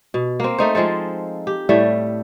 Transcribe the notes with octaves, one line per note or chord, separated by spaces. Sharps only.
B2
A#3 C4
A3 D#4 C5
F3 G#3 C4 A4
G4
A2 G3 A3 E5